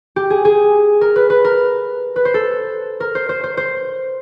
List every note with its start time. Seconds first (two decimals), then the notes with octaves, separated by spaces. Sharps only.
0.16 G4
0.30 G#4
0.45 G#4
1.01 A#4
1.16 B4
1.30 B4
1.44 A#4
2.16 B4
2.25 C5
2.34 A4
3.00 A#4
3.15 C5
3.29 C5
3.44 C5
3.57 C5